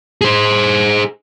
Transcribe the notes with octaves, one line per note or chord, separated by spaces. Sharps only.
G#4 C5